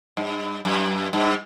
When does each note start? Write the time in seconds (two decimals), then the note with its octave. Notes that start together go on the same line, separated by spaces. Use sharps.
0.17 G2
0.65 F#2
1.13 G2